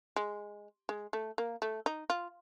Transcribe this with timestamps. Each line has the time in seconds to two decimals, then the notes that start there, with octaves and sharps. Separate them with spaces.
0.16 G#3
0.89 G#3
1.13 A3
1.38 A#3
1.62 A3
1.86 D#4
2.10 F4